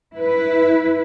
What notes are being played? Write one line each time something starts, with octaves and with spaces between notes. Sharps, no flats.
E4 B4